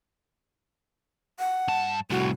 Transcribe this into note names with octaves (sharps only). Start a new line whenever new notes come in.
F#5
G2 A5
C2 A2 F#4